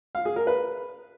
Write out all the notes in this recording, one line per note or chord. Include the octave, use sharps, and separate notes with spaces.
F5
G#4
A#4
B4